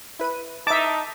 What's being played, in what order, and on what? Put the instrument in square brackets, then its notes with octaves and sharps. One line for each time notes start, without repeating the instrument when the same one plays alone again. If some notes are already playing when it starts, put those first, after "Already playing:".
[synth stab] E4 B4 D#7
[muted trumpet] D#4 [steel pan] E5 D6 [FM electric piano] A5